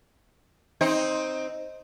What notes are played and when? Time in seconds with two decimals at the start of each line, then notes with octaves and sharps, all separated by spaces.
0.81 C4 D#4